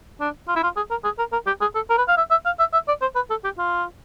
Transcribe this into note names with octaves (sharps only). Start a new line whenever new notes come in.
D4
F4
E4
F4
G#4
A#4
G#4
A#4
A#4
G4
G#4
A4
A#4
B4
F5
E5
E5
F5
E5
E5
D5
C5
B4
A4
G4
F4